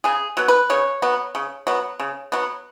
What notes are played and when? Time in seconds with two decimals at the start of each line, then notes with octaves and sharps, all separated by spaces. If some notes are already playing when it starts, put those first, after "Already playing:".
0.04 C#3 G#4
0.37 F#3 B3
0.48 B4
0.70 C#3 C#5
1.02 F#3 B3
1.35 C#3
1.67 F#3 B3
2.00 C#3
2.32 F#3 B3